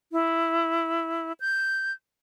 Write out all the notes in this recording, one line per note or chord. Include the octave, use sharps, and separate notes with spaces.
E4
G6